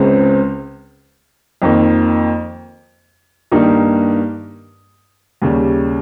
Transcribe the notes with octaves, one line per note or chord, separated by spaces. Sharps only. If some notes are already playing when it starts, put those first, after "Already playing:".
Already playing: C#2 C#3 G#3 C4
F2 D#3 A#3
G2 D#3 A#3 D#4 G4
D#2 C#3 G3